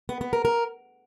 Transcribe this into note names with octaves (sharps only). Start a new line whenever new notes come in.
B3
B3
A#4
A#4